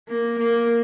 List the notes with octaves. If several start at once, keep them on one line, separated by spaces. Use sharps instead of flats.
A#3
A#3